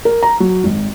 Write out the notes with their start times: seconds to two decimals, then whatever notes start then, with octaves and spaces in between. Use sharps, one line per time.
0.05 A#4
0.23 A#5
0.40 F#3
0.64 G#1